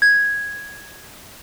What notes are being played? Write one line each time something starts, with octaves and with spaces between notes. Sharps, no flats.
G#6